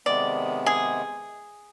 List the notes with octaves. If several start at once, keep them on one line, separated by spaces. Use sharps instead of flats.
C3 D#3 G#3 B3 D5
G#4